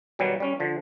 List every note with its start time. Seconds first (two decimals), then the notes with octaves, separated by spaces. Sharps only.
0.19 B2 D#3 F#3 G3
0.40 G3 C#4
0.60 D3 F3